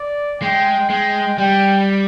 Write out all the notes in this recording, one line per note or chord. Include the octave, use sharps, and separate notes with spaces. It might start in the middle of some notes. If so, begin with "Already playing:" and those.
Already playing: D5
G#3 G5
G#3 G5
G3 G5